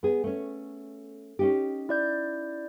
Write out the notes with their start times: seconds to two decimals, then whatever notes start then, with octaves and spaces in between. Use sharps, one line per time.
0.03 B3 G#4
0.24 A3 C#4
1.39 C#4 D#4 G4
1.89 E4 D5 G6